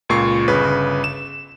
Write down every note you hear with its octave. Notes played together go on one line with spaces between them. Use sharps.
C#2 A#2 C#6 C7
G1 C#3 B4
E7